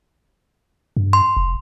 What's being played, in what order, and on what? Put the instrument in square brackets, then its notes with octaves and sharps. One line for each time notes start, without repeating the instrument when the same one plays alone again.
[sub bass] G2
[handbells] C6
[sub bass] F1